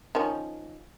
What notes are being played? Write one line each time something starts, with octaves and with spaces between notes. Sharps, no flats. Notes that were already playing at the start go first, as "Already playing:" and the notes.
D#3 F3 C#4